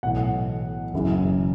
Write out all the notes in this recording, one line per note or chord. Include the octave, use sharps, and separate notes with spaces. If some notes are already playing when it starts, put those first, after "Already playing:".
B1 A2 E3 F#5
F#1 F#2 C#3 E3